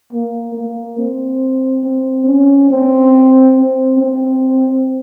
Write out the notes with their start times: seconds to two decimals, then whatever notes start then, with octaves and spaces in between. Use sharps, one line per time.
0.13 A#3
0.55 A#3
0.99 C4
1.84 C4
2.27 C#4
2.71 C4
3.57 C4
3.99 C4